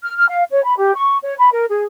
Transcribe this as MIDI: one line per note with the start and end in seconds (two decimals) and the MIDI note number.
0.03 0.16 89
0.17 0.28 89
0.28 0.43 77
0.51 0.63 73
0.63 0.76 83
0.77 0.95 67
0.95 1.17 85
1.23 1.34 73
1.38 1.50 83
1.53 1.66 70
1.69 1.84 68